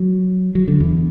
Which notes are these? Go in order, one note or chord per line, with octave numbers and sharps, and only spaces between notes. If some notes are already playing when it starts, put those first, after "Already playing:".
Already playing: F#3
F#3
D3
E2